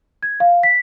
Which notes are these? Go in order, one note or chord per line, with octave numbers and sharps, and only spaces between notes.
G#6
F5
B6